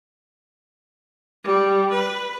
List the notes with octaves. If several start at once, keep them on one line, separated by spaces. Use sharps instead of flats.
G3
B4